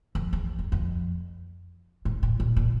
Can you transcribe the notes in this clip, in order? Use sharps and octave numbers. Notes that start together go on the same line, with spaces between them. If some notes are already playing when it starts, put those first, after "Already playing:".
F2
E2
F2
F2
G#2
A2
A#2
A#2